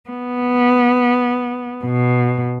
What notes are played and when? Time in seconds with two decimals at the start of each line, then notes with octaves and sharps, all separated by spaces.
0.10 B3
1.84 B2